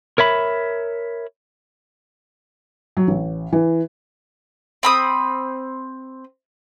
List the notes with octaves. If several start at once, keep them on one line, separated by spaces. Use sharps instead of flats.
A#4 C#5 E5 B5
F#3
A1
E3
C4 B5 D#6